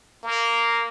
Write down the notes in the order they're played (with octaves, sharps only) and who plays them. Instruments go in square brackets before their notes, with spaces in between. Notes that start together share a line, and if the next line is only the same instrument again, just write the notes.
[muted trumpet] A#3